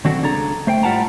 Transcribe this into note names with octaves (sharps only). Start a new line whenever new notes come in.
D#3 F#3 C4 D4 F#4 A4
C#2 D4 G#4 A4 A#5
A3 C5 G5
A2 G3 F4 F#5 A5 A#5